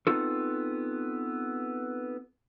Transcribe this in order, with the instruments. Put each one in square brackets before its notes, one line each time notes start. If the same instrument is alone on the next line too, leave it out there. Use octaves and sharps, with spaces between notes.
[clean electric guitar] B3 C4 D#4 F4 A4